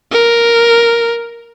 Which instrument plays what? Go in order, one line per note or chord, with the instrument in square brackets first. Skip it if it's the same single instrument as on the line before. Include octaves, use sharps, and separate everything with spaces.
[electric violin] A#4